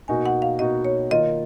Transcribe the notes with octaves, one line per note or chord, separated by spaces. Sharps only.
B2 A#3 D#4 F#4 G#5
F#5
F5
B2 A#3 D#4 F#4 D#5
C#5
D#3 A#3 F4 D#5